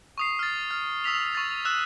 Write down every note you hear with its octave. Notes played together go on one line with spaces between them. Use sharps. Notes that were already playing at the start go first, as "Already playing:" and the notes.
C#6 D#6 C7
F6 A6
F6
D#6 E6 B6 F7
C#6 A6
E6 F#6 E7